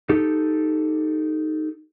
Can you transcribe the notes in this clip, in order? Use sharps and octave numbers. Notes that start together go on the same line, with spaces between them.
D#4 G4 A4